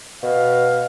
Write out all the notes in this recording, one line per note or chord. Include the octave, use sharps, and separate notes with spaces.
B2 F5